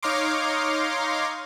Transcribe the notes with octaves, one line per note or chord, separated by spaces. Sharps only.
D#4 C#5 F5 A#5 C6 D6